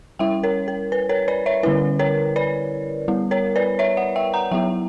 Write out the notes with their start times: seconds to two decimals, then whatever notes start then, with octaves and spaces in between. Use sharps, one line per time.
0.19 G3 C#4 E4 E5 G5
0.43 A#4 C#5
0.68 A#4
0.92 B4
1.09 A#4 C#5
1.28 B4 D5
1.46 C#5 E5
1.63 D3 G3 C#4 E4 B4
1.99 A#4 C#5
2.36 B4 D5
3.08 G3 B3 E4
3.31 A#4 C#5
3.56 B4 D5
3.79 C#5 E5
3.97 D5 F#5
4.16 E5 G5
4.34 F#5 A#5
4.51 F#3 B3 E4 E5 G5